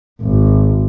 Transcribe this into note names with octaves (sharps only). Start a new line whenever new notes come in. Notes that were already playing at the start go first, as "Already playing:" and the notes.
G#1